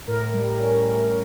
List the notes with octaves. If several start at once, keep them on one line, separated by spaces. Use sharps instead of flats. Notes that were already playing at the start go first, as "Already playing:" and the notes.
A2 A#4
G3
C#4
A2